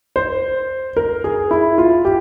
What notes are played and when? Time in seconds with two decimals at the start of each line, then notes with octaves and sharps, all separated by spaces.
0.16 C5
0.97 A#4
1.24 G#4
1.51 E4
1.78 F4
2.05 G4